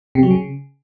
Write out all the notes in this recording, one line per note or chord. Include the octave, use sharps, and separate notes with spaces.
C3
F#3
C#3